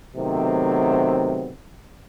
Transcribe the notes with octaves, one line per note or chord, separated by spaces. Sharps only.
C3 D#3 F#3 A3 B3 C4